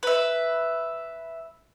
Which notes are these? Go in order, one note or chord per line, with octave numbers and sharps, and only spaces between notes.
B4 E5